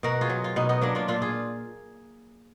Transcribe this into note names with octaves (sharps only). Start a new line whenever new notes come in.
B2 F#4 A#4
F4 G#4
F#3
F4
B2 B3 D#4
B3 D#4
F#3 A#3 D4
D4 F4
A#2 D4 F4
F4 G#4